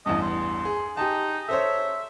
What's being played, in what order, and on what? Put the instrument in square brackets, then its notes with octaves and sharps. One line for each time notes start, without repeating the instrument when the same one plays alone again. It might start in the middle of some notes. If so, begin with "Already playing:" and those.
[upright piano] A1 E2 G2 [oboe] D#5
[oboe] C6
[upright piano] G#4
[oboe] D#4 [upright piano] G4 G#5 A5
[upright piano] A4 C5 C#5 [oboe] E5